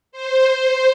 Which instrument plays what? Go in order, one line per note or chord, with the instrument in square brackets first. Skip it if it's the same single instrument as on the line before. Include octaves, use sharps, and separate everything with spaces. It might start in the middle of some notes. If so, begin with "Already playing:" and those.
[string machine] C5